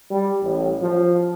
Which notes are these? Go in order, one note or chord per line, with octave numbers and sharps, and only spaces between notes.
G3
A1
F3